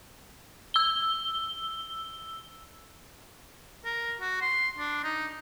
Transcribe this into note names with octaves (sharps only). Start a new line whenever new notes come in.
E6 G7
A#4
F#4
C6
D4
D#4